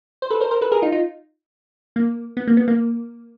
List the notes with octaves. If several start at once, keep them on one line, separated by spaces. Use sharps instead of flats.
C5
A4 B4
A#4 C5
A#4 C5
A4 B4
G#4 A#4
D#4 F4
D#4 F4
A#3
B3
A#3
B3
A#3